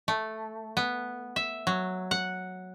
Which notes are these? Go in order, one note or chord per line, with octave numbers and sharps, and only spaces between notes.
A3
B3
E5
F#3
F#5